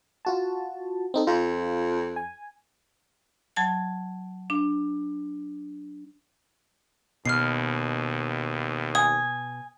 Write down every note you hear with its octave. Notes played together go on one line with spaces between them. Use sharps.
F4 F#4 A5
C4 D#4 A4
F2 F4
G#5
F#3 A5 G#6
D4
D#2 B2 F6 C7
G#5 D#6